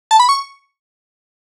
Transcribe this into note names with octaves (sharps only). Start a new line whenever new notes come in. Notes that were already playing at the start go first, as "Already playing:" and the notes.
A5
B5
C#6